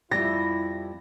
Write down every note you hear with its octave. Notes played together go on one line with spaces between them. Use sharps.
F2 G3 E4 G4 A#6